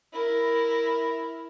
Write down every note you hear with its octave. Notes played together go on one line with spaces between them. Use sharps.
E4 A#4